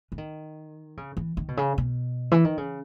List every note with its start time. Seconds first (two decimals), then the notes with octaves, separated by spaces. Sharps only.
0.12 E3
0.18 D#3
0.97 C#3
1.17 E3
1.37 D#3
1.48 B2
1.57 C#3
1.78 B2
2.32 E3
2.45 D#3
2.57 C#3